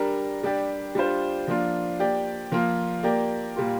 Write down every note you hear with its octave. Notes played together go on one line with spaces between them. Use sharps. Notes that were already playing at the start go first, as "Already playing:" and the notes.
Already playing: G3 D4 A#4
G3 D4 G4 D5
G3 D4 F4 C5
F3 A#3 D4 F4
A#3 G4 D5
F3 A#3 F4
A#3 G4 A#4 D5
A#2 G3 A#3 F4